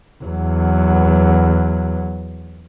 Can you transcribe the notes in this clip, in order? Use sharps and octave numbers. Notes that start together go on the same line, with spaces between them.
E2 F#3